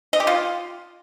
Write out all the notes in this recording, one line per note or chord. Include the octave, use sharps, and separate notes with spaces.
D#5
G4
F4